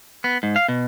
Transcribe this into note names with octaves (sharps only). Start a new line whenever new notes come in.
B3
G#2
F5
B2